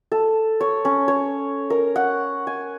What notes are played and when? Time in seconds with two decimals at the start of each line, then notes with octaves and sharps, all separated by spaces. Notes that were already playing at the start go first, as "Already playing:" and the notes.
0.12 A4
0.61 C#5
0.85 C#4
1.08 C#5
1.70 A#4
1.96 F#5
2.47 G#5